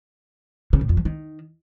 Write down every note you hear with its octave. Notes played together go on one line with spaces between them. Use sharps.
C#3
A2
F2
F3
D#3